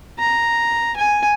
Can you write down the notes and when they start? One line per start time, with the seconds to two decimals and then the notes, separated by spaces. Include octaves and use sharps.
0.19 A#5
0.96 G#5